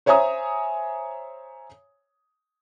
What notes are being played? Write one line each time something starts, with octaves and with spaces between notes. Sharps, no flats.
C5 C#5 E5 G#5 A#5 D#6